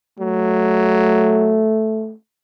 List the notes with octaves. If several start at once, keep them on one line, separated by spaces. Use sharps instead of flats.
F#3 A3